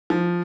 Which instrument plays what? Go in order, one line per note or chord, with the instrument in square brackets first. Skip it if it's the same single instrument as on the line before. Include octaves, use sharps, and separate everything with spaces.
[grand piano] F3